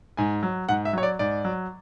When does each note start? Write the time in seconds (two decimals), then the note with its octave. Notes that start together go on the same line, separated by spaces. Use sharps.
0.17 G#2 G#5
0.43 F#3
0.69 G#2 F#5
0.85 E5
0.93 F#3 C#5
1.03 D5
1.19 G#2 D5
1.45 F#3